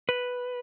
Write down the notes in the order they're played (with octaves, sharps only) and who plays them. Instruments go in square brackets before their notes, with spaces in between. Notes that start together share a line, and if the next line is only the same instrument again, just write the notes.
[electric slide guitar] B4